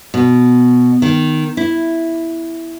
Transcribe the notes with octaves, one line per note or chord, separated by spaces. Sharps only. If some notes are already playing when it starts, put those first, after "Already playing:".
B2
D#3
E4